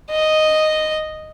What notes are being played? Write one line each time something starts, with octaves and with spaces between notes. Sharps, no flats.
D#5